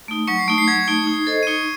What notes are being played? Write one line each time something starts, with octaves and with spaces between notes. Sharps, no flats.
A3 D#4
F#3 C#6 C#7
C7
A3 D#4
C7
F#3 G#6
A3 D#4
D#4
A4 C5 D#5
D#7
D#4 C#6 C#7